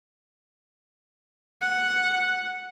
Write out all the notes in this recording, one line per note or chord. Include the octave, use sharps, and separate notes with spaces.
F#5